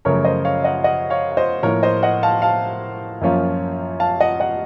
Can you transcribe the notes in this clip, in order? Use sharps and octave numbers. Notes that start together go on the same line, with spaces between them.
F#2 C#3 F3 A3 C#4 A#4 C#5
C5 D#5
C#5 F5
D#5 F#5
D#5 F#5
C#5 F5
F5
C5 D#5
A2 F3 A#3 A#4 C#5
C5 D#5
D#5 F#5
F5 A5
F5 A5
F#2 F3 A#3 C#4 F4
F5 A5
D#5 F#5
D#5 F#5